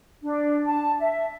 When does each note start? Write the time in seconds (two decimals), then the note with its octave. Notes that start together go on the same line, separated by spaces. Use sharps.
0.22 D4
0.67 A5
1.00 E5